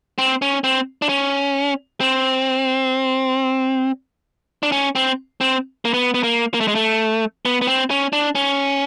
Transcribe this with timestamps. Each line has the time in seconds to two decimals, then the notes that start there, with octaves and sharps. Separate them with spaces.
0.18 C4
0.42 C#4
0.64 C4
1.02 D4
1.09 C#4
2.00 C4
4.63 D4
4.72 C#4
4.95 C4
5.41 C4
5.85 A#3
5.94 B3
6.14 B3
6.23 A#3
6.54 A#3
6.61 A3
6.68 G#3
6.75 A3
7.45 B3
7.61 B3
7.67 C4
7.90 C#4
8.13 D4
8.35 C#4